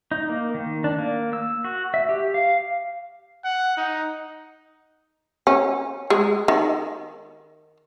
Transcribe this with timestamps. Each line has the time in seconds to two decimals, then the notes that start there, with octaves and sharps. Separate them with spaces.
0.11 D#4
0.29 A#3
0.54 D#3
0.84 D4
0.98 A#3
1.33 E6
1.64 F#4
1.94 E5
2.09 G4
2.34 F5
3.45 F#5
3.77 D#4
5.47 C#4
6.10 G#3
6.48 D#3